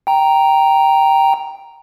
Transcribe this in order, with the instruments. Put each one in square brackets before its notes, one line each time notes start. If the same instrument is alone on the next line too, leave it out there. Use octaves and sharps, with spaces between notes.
[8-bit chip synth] G5 A#5